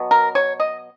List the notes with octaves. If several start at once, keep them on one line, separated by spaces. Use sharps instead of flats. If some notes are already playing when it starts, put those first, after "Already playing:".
Already playing: B2 F#3 B3
A#4
C#5
D#5